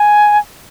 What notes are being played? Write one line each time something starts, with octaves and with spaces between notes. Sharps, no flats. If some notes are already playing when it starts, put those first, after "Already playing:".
Already playing: G#5